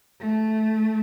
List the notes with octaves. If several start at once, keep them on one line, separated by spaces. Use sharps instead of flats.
A3